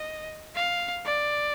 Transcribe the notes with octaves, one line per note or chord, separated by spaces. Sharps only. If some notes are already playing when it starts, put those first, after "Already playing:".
Already playing: D#5
F5
D5